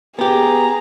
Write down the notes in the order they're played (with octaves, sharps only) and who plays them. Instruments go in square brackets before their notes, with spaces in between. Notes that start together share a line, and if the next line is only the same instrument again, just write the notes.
[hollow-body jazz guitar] B3 G4 [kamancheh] G#4 A#5